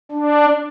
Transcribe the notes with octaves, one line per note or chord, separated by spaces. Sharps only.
D4